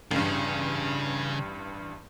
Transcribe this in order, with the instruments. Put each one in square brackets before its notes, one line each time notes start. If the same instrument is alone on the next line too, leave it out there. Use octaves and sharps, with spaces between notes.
[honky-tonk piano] A1 G2 [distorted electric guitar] C#3